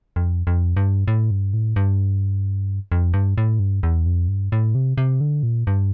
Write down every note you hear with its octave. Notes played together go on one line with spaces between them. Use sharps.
F2
F2
G2
A2
G2
A2
G2
F2
G2
A2
G2
E2
F2
G2
A2
C3
C3
D3
A#2
G2